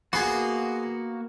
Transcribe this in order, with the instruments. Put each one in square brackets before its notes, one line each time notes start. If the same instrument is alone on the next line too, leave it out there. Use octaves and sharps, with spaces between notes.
[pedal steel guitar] A#3 F#4 [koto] B3 [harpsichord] G#4 C6